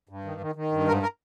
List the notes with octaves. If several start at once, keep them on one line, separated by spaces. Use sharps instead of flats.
G2
D#3
D#3
D#3
G2
G#2 A#4
A#4